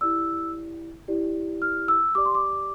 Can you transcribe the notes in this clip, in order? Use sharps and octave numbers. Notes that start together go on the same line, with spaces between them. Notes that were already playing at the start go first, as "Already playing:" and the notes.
E4 G4 D5 E6
E4 G4 D5
F6
E6
G4 D5 D6
C6
D6